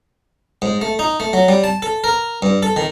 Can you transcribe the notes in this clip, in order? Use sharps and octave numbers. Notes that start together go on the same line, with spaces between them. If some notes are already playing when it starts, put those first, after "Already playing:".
G#2
A3
D#4
A3
F#3
G3
A5
A4
A#4
G2
A4
D#3